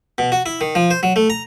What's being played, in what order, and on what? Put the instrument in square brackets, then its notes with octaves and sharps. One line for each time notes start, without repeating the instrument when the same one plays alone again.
[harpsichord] B2
F#4
E4
D#3
F3
C5
F#3
A3
A#5